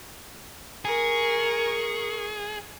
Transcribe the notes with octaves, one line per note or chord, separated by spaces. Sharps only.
G#4 A#4 C#6